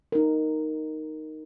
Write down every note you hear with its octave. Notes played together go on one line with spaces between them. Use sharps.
D#4 A#4